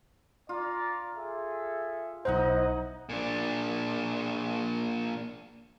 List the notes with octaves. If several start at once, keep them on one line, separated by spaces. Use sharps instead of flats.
F4 D5 A#5
G#4 A4 E5
B1 D#4 E4 C5 D#5 F#5 A#5
A#2 D4